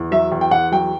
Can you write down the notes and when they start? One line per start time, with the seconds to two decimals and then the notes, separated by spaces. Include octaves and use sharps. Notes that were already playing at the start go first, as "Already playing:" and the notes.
Already playing: E2
0.11 F#3 E5
0.32 E2
0.41 G5
0.51 E2 F#5
0.72 F#3 G5